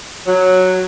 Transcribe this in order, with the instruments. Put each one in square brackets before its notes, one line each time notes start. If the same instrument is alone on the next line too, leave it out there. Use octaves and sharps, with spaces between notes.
[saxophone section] F#3